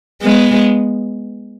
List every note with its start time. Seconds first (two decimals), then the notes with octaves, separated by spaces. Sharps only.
0.22 G#3 B3